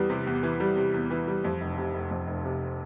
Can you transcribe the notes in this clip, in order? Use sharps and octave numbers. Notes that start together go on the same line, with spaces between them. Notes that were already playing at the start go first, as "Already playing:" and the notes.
Already playing: E2 E3 G3
C3
E2
E3
G3
C3
E2
E3
G3
F2
F1
C3
F1
F2
F1
C3